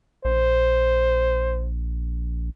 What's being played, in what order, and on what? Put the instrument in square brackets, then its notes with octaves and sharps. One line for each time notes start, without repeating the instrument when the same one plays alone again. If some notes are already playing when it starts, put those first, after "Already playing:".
[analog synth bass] A#1 [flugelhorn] C5